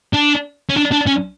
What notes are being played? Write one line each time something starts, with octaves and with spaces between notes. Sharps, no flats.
D4
C#4
D4
D4
C#4